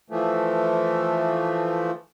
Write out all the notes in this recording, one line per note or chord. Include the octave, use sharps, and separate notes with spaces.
E3 F3 A3